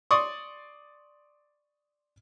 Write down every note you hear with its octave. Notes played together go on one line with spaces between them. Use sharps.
D5 C6 C#6 D#6